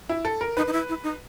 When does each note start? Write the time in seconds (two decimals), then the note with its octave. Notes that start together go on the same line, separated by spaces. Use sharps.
0.09 E4
0.25 A4
0.41 A#4
0.57 D#4 B4
0.68 D#4
0.73 E4
0.89 E4
1.04 D#4